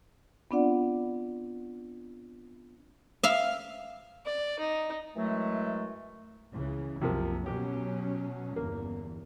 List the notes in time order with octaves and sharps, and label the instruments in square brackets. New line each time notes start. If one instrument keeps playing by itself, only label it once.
[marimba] B3 C4 D4 F4 D5 F#5
[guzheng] E5 F5
[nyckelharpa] D5
D#4
[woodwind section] F#2 E3 F#3 G#3 A3
[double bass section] C#2 C#3 E3
[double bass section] F#1 C2 [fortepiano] C3 F3 A#3
[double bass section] B2 F#3 C#4 [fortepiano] G4
[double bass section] G1 E2 [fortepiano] A#3